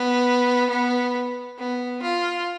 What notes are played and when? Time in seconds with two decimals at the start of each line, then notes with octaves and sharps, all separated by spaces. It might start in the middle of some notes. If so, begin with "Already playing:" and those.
Already playing: B3
0.70 B3
1.58 B3
2.02 F4